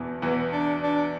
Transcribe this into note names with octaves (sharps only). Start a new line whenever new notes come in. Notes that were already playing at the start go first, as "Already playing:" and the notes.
Already playing: E2 B2 E3
E2 E3 B3
D4
D4